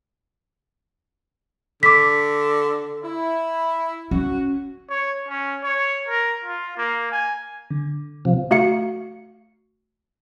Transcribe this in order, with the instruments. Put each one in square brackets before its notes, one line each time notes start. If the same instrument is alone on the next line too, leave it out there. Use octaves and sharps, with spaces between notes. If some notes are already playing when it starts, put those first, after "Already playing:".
[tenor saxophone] D3 [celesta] D6 B6
[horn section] E4
[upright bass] C#4 [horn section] F#4
[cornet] C#5
C#4
C#5
A#4
F4
A#3
G#5
[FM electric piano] D3
[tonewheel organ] C3 F3
[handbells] A3 F#4 F5 C#7